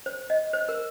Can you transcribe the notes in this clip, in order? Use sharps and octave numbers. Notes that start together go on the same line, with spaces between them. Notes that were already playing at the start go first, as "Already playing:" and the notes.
C5
D#5
C5
A#4